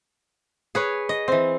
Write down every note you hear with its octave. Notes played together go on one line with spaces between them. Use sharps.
G#4 B4 C#5
D#5
E3 C4